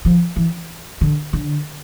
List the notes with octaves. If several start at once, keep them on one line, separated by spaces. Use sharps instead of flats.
F3
E3
D3
D3